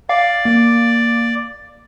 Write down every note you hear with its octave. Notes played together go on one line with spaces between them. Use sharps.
D5 F5
A#3